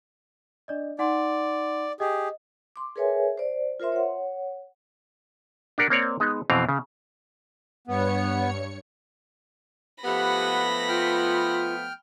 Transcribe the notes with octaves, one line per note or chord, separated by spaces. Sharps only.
D4 D5 D#5
D#4 D5 F#5 C6
G4 G#4 D#5
C6 D6
G#4 A#4 B4 C#5 E5 G#5
C5 D5
F4 A#4 C5 E5 C6
C#5 F#5
D4 G4 A#4 F#5
A#3 C4 C#5 D5
G#3 B3 D#4
F2 B2 E3 C4 F5
C#3
G2 B3 C#5 C#7
F3 A3 B3 G4 F#5 B5 A#6
F4 G5 F6